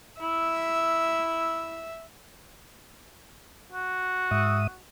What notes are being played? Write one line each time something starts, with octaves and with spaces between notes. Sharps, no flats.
E4 E5
F#4
G#2 E5 D#6